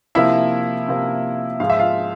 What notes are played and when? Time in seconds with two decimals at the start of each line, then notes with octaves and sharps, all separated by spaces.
0.15 C3 F3 A#3 E4 E5
0.88 C3 F3 A#3
1.60 G#2 F3 G#3 F5
1.70 E5
1.79 F4 F5